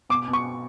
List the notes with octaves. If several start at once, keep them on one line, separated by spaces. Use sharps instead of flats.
B2 D6
B2
C#6